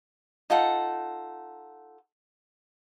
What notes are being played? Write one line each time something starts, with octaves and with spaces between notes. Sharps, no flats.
D#4 F4 A4 F#5